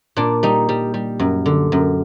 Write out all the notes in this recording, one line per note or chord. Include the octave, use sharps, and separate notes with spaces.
A#2 D4
G3 D#4
G3
G3
F#2
D3
F#2